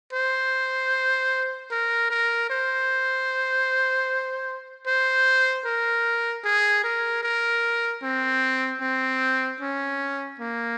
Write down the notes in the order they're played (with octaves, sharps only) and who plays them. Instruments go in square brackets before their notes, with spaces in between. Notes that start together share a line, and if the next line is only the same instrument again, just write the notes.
[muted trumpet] C5
A#4
A#4
C5
C5
A#4
G#4
A#4
A#4
C4
C4
C#4
A#3